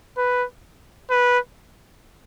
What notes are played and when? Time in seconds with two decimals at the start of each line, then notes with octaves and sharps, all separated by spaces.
0.17 B4
1.10 B4